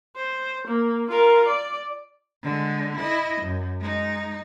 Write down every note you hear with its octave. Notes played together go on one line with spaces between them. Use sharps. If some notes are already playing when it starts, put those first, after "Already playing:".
C5
A#3
F4 A#4
D5
D3 G#3
E4 D#5
F#2
G#3 D#4